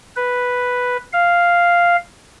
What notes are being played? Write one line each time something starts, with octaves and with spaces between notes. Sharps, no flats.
B4
F5